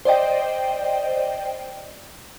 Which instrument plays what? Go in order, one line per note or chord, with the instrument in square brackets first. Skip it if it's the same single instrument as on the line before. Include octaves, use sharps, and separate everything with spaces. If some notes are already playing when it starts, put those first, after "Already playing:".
[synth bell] C5 D5 D#5 G5